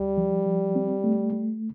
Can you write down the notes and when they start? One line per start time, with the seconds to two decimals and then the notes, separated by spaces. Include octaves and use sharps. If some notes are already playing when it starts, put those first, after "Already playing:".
Already playing: D2 G3
0.17 F3
0.46 F3
0.76 C4
1.04 A3
1.33 A3